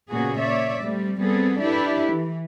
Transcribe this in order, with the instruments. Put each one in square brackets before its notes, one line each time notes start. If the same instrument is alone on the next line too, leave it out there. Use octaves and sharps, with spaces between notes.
[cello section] A#2 C#3 A#3 B3 F#4 G#4
C#5 D5 E5
G3 A3 C4
G3 B3 C4 G#4 A4
D4 E4 G4 A4 B4
E3